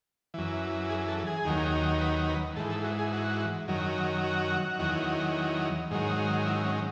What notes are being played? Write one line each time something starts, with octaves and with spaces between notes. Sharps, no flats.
F#2 E3
G#4
A4
G#4
D#2 D#3 F#3
B4
B4
G#2 E3 A4
A4
F#4
G#4
F#4
F#2 D#3 F#3
F#4
E2 D#3 F#3
G#2 D#3 F#3
E4
C#4